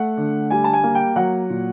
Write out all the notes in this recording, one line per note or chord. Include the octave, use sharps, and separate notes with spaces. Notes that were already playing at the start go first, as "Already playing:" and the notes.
Already playing: A3 F#5
D3
G3 G#5
A5
G#5
A#3
G5
F#3 F#5
A#2